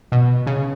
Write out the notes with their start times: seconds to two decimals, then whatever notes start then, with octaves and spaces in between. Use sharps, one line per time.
0.12 B2
0.47 C#3